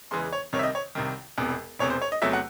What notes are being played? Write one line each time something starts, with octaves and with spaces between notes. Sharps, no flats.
E2 C#3 E3 G#3 C6
C#5
C2 C3 D#3 C#5
E5
D#5
C#5
C2 C3 D#3
E1 E2 C3
E1 E2 C3 C#5
C5
C#5
D#5
E2 C3 F#3 A3 E5
F#5